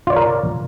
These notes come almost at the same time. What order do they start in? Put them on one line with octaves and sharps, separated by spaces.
F4 D5 C#5 A#4